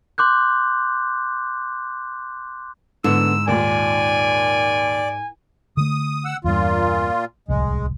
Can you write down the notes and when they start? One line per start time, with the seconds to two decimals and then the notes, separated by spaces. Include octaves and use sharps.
0.18 C6 D6 F#6 G6
3.04 G#2 D3 B3 E6
3.48 D#2 A#2 D5 G#5
5.77 D3 A3 D#6
6.25 F#5 E6
6.44 E2 G2 A#2 F4
7.48 D1 C2 F2 G#3